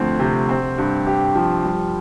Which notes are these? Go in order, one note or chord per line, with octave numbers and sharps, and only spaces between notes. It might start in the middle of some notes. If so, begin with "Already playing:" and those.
Already playing: D2 F3 C4
C3
C4
G2
G4
F3
G3